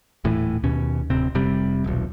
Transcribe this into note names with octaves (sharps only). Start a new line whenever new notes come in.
D#1 A2 E3
D#2 B2 C#4
D1 C3 C4
F1 C3 G3
D#1 B1